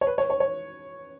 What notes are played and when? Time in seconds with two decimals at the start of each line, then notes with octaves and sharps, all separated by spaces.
0.01 C#5
0.07 B4
0.18 C#5
0.30 C#5
0.40 C#5